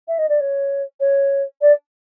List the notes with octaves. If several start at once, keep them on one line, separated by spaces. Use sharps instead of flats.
E5
D#5
D5
C#5
C#5
D5